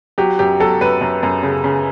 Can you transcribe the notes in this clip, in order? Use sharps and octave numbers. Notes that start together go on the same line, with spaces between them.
F#3 G4
F#2 G4
F#3 A4
F#2 B4
F#2
F#2
C#3
C#3